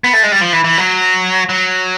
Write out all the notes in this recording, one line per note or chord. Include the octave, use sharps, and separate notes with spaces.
B3
A3
G#3
G3
F3
E3
E3
F#3
F#3